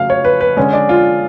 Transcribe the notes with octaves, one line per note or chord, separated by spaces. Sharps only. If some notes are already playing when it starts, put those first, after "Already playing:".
Already playing: C#3 F#3 A3 F5
C#5
B4
B4
D3 G#3 C#4
D4
F4